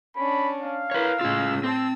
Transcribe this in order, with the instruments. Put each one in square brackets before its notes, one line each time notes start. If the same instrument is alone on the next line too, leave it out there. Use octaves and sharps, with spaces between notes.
[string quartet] C#4 D4 [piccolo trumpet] B5
[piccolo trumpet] F5
[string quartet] E4 A#4 [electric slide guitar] B4 C#5
[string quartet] A2 C#3 E6 [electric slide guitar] C#4 F4
[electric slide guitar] C4 [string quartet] A5 E6